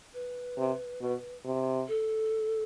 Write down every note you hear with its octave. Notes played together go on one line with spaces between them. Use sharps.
B4
C3
B2
C3
A4